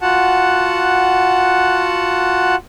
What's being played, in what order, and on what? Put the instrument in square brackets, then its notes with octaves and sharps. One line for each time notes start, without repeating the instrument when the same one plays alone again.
[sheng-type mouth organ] F4 F#4 F#5 A5